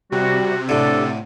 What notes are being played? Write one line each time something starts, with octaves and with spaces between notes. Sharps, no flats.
C3 G3 F#4
A2 D3 D4 A4